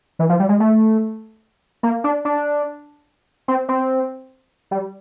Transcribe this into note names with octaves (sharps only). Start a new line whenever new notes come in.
E3
F3
G3
G#3
A3
A#3
D4
D4
C4
C4
G3